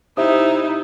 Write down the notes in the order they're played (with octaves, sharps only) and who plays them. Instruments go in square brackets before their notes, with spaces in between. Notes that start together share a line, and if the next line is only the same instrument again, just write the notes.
[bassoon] C3 [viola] D#4 E4 [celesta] E5 D#6